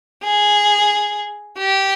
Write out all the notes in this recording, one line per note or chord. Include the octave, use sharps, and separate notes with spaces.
G#4
G4